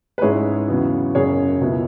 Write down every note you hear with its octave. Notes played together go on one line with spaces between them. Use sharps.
B4
G#2 G#3 C#4 E4 G#4 C#5
E2 C#3 F#3 B3
F#1 F#2 C#3 G#4 C#5
C#2 B2 B3 E4